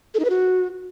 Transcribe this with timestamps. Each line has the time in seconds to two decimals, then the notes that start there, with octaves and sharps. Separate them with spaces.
0.14 A4
0.20 D#4
0.25 B4
0.30 F#4